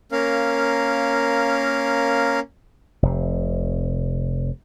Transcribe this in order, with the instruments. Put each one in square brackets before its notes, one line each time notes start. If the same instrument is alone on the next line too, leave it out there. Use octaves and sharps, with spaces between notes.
[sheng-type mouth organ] A#3 C#4 A#4 F5
[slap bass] F1 C3